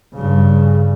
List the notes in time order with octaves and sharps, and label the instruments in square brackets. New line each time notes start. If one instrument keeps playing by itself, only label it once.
[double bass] G2 C#3